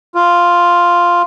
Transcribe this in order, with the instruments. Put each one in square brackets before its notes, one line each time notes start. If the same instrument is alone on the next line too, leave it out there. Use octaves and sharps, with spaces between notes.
[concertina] F4